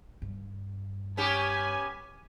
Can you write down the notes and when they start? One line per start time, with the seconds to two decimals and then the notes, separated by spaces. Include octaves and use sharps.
0.22 G2
1.17 B3 C#4 G4 G#5